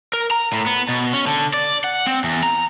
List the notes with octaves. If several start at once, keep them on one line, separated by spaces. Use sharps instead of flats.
A#4
A#5
A2
B3
B2
C#4
D3
D5
F#5
C4
E2
A#5